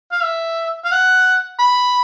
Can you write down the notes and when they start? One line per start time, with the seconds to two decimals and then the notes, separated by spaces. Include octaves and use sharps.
0.12 F5
0.23 E5
0.84 F5
0.92 F#5
1.59 B5